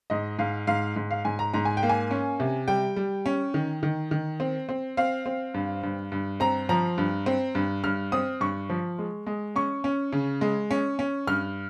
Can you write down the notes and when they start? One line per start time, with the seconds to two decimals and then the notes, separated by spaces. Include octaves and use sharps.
0.10 G#2 D#5
0.39 G#2 F5
0.67 G#2 F5
0.96 G#2
1.11 F5
1.25 G#2 G#5
1.39 A#5
1.54 G#2 A#5
1.65 G#5
1.77 G5
1.83 A#3
1.89 G#5
2.11 C#4
2.40 C3
2.68 G3 G5
2.96 G3
3.26 C#4
3.54 D#3
3.83 D#3
4.11 D#3
4.40 C4
4.69 C4
4.97 C4 F5
5.26 C4
5.54 G2
5.83 G2
6.12 G2
6.40 C4 A#5
6.69 F3 A#5
6.98 G2
7.26 C4
7.55 G2
7.84 G2 F6
8.12 C4 D#6
8.40 G2 C#6
8.70 F3
8.99 G#3
9.26 G#3
9.56 C#4 C#6
9.84 C#4
10.13 C#3
10.41 G#3
10.71 C#4
10.99 C#4
11.27 G2 F6